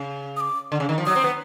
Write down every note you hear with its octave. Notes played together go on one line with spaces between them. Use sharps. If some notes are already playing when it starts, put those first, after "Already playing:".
Already playing: C#3
D#6
D6
D3
C#3
D#3
F3
F#3 D#6
C4
B3